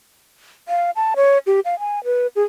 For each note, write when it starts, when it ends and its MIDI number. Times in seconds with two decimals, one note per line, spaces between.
0.68 0.91 77
0.96 1.14 81
1.16 1.38 73
1.47 1.60 67
1.65 1.78 77
1.79 2.03 80
2.04 2.27 71
2.36 2.43 68